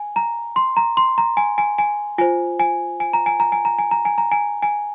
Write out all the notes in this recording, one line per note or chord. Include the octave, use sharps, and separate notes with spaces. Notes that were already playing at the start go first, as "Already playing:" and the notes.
Already playing: G#5
A#5
C6
A#5
C6
A#5
G#5
G#5
G#5
F4 C5 G#5
G#5
G#5
A#5
G#5
A#5
G#5
A#5
G#5
A#5
G#5
A#5
G#5
G#5